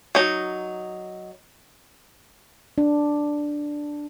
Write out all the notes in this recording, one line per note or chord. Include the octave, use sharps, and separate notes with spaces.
F#3 D#4
D4